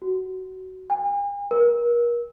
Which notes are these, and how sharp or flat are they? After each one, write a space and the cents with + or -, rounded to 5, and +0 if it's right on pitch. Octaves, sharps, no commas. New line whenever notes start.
F#4 +20
G#5 -45
A#4 +35